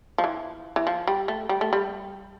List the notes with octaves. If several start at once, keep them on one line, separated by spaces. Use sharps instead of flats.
F3
E3
E3
F3
G3
A3
G3
A3
G3